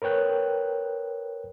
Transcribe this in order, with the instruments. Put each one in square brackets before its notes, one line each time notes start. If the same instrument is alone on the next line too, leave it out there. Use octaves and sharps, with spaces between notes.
[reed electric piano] A#4 B4 C#5 G5 F#6